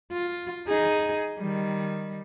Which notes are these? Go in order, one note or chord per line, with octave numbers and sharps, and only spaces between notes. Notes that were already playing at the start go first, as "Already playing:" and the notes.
F4
D#4 G#4
D#3 G3